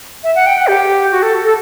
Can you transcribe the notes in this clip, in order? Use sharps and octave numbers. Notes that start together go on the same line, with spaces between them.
E5
F#5
G5
F#5
G4
F#4
A4
A4